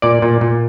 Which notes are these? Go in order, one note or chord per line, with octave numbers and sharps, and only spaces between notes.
A#2 D5
A#2
A#2